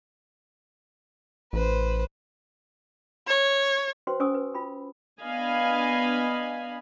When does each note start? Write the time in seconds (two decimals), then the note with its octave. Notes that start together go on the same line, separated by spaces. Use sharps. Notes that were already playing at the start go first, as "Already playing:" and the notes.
1.53 A1 B4 C5
3.27 C#5
4.07 F#4 B4 C5 G5 C6
4.20 C#4 C5 G#5 C#6 D#6 E6
4.34 B4
4.55 F4 G5 B5
5.20 B3 D4 D#5 F5 G#5 B5